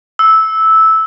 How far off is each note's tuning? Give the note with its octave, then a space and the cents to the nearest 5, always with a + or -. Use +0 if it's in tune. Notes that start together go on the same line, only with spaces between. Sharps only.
E6 -10